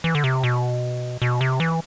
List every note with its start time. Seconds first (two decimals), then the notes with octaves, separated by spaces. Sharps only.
0.04 E3
0.15 D3
0.24 C3
0.44 B2
1.22 B2
1.41 C3
1.60 E3